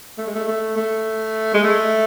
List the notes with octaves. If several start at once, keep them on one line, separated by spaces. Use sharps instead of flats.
A3
G#3
A3
A3
A3
G#3
A3